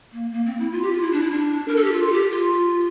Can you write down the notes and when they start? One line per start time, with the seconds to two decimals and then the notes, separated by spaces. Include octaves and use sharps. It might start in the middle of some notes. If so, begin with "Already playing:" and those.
0.13 A#3
0.32 A#3
0.46 C4
0.60 E4
0.72 F4
0.83 G4
0.92 F4
1.02 E4
1.12 D4
1.21 E4
1.31 D4
1.68 A#4
1.76 A4
1.84 G4
1.92 F4
2.07 A4
2.12 G4
2.32 F4